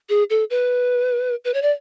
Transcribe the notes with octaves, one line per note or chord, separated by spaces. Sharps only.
G#4
A4
B4
B4
C#5
D5